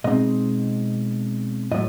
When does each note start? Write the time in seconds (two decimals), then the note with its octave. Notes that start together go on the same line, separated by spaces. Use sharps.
0.04 B2 G#3 C4 D#4 D#5
1.71 A2 F#3 D#5